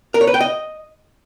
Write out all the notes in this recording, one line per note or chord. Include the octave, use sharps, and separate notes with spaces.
A#4
C#5
B4
G5
D#5